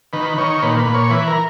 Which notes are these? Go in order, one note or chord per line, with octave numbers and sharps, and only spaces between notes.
D#3 B4
D#3 C#5
A#2 B4
B4
A#2
C#5
E3 B4
A#4